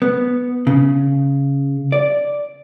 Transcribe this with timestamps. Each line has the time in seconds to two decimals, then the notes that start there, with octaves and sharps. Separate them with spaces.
0.02 B3
0.67 C#3
1.92 D5